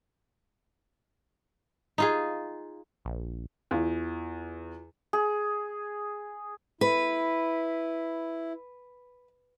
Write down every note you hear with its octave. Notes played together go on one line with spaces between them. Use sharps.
D#4 F4 G#4
A#1
E2 F4
G#4
E4 B4